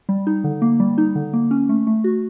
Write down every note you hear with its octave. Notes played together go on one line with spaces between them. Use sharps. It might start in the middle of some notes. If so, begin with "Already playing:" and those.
G3
D#4
D3
A#3
G3
D#4
D3
A#3
C#4
A3
A3
F#4